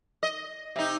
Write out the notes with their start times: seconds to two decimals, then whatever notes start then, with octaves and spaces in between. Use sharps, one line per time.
0.23 D#5
0.76 C3 D#4